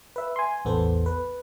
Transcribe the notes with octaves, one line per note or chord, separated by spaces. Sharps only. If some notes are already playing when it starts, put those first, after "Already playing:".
B4 E5
G#5 C6
A1 E2 B3 A4 C5
B4